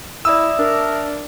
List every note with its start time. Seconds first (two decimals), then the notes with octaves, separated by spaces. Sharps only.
0.25 E4 D5 E5 D#6 E6
0.59 D4 A#4